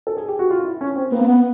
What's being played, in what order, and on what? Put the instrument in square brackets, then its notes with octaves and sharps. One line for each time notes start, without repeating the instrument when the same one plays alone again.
[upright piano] A4
G#4
G4
F#4
F4
E4
C#4
C4
[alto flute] A#3 [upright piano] B3
[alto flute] C4
B3